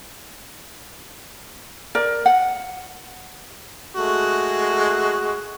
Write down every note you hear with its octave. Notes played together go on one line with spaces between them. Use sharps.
A#4 D5
F#5
G#3 A3 F#4